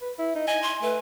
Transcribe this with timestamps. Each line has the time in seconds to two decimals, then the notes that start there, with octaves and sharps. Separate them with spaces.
0.01 B4
0.19 E4
0.35 D#4
0.48 D#5 G#5
0.62 C6
0.82 A3 B4